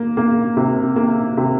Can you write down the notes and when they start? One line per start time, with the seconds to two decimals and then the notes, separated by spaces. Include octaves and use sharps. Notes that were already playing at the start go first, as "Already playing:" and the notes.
Already playing: A#3
0.17 A#3
0.57 C3
0.96 A#3
1.37 C3